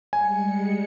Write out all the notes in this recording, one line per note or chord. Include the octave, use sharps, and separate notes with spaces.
G3 G#3 G#5 C#7